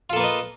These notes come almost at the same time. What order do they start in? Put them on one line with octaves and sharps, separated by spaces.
F4 A4 A#3 B4 D#5